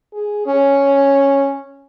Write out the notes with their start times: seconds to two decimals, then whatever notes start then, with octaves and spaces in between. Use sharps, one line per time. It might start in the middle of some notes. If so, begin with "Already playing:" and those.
0.13 G#4
0.46 C#4